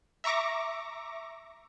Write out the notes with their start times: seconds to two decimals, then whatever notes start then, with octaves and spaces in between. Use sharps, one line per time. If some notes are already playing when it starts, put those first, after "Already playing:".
0.24 E5 A#5 C#6 D6 A#6